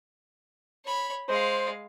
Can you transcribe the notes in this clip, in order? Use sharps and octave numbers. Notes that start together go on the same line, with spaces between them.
C#5 B5
G#3 C5 F5